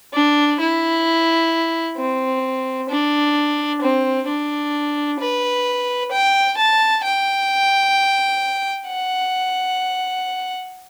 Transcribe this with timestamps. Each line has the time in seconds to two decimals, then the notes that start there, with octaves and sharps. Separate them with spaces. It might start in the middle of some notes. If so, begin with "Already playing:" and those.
0.13 D4
0.60 E4
1.97 C4
2.89 D4
3.81 C4
4.28 D4
5.20 B4
6.11 G5
6.57 A5
7.04 G5
8.88 F#5